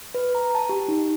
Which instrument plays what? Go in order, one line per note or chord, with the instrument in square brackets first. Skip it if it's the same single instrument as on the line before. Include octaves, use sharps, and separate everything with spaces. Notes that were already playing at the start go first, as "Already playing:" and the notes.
[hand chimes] B4
A#5
A5
G4
D#4